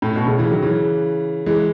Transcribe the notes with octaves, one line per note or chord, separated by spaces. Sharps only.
A2
B2
A2 C#3
C#3 E3
D#3 F#3
C#3 E3
E3 G#3